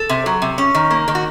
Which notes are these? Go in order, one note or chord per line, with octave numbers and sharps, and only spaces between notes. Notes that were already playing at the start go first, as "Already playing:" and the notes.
Already playing: A4
C3
F#3
C3
C#4
D#3
A#3
D#3
F#4